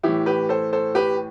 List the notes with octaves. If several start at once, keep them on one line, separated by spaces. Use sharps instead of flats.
A2 E3 E4 G4
G4 B4
A4 C5
A4 C5
G4 B4